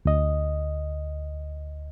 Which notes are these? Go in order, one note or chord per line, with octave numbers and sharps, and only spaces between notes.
D2 D#5